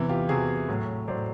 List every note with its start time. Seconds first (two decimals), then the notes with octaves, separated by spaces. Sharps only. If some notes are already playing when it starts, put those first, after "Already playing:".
Already playing: E2 C3 E3
0.09 F4 G4
0.29 E2 C3 E3 F#4 G#4
0.69 A2 F#3
1.08 F#3 C5 D5
1.11 A2